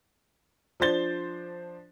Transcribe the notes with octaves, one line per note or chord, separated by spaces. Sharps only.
F3 D4 C5 A6 G7